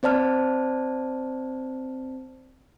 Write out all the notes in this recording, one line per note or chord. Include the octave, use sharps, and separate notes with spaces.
C4 C5 D5 A5 F6